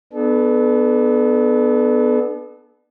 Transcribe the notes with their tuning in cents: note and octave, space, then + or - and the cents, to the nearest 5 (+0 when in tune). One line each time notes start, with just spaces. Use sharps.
B3 +0 D4 +30 A4 -35